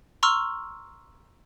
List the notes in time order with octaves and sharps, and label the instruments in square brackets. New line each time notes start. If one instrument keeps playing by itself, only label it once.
[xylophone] A#5 C6 C#6 E6 F6